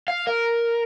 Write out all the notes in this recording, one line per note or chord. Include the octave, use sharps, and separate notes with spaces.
F5
A#4